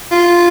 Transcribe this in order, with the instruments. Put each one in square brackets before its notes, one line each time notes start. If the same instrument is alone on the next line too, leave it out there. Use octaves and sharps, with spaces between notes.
[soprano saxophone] F4